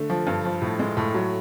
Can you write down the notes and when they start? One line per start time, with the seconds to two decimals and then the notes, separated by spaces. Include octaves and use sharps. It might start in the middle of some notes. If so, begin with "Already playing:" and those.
Already playing: D3 A3
0.10 F3
0.27 G2
0.45 F3
0.62 A2
0.79 G#3
0.97 A2
1.15 F#3